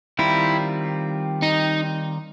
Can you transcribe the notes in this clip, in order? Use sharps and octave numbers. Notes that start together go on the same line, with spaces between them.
D#3 G3 C4 E4 F4
D#4